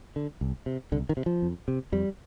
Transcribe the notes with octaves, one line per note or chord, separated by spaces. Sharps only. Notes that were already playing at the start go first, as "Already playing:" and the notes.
D3
C2
C3
C2 D3
D#3
C3
F3
F2
C3
F2 G3